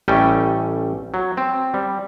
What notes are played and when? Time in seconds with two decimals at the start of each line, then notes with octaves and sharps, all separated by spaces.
0.08 A1 G3 A3 C#4 G5
1.14 F#3
1.37 C4
1.74 G3